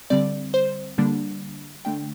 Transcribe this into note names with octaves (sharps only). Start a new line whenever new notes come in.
D3 G3 C4 D5
C5
D3 G3 A#3 D4
D3 A3 D4 G5